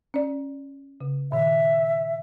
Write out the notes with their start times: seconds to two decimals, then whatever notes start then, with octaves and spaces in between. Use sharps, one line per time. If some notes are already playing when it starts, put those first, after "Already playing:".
0.14 C#4 D5
1.01 C#3
1.32 A#2 D#3 E5